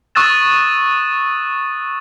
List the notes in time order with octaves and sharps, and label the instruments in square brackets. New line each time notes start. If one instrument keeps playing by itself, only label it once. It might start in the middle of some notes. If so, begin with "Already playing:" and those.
[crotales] C#6 D#6 E6 F#6 A6 E7